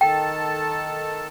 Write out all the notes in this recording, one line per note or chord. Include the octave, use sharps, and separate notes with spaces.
D#3 A4 G5 A5